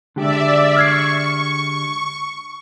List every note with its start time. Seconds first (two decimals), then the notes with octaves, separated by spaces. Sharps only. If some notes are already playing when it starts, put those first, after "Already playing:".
0.16 D3 G#3 G4 D5 E5
0.76 C#6 F6 G#6 C7